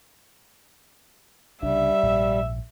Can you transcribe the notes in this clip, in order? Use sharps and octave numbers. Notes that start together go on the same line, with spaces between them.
C2 C#3 G3 D4 E5
A#1 G#2